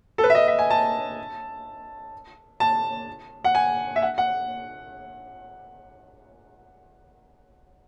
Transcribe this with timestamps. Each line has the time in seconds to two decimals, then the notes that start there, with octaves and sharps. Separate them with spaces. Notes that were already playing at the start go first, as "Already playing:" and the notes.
0.18 A4
0.24 B4
0.30 E5
0.35 D#5
0.48 E5
0.59 G#5
0.70 A5
2.60 A5
3.44 F#5
3.55 G#5
3.96 E5
4.02 F#5
4.18 F#5